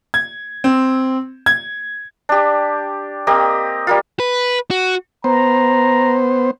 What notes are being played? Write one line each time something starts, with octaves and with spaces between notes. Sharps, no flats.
G#6
C4
G#6
D4 G4
A#3 C4 G4 D#5
G3 A#3 F4
B4
F#4
B3 C5 A#5